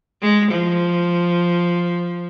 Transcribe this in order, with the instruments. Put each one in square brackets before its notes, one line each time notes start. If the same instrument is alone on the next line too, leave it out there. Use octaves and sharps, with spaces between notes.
[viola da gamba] G#3
F3